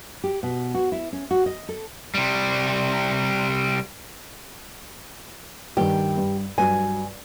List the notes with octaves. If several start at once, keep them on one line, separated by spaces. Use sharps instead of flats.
G4
B2
F#4
E4
C#4
F#4
D#5
A4
C3 G3
G2 D#3 G4
G2
G2 F#3 G#5